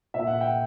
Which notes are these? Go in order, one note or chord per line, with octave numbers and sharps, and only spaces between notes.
A#2 E5
F#5
G5